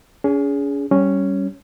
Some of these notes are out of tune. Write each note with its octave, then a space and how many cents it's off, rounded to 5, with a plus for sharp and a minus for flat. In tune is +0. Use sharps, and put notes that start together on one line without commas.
C#4 +40 G#4 +0
G3 -15 C#4 +0